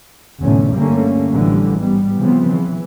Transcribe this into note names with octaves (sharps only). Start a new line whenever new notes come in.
F1 E2 A2 D3 A3 C#4
G2 D3 G3 A3 A#3 C#4
A1 D3 E3 F3 G3
G#2 G3 B3
C#3 E3 F3 B3 C4
E3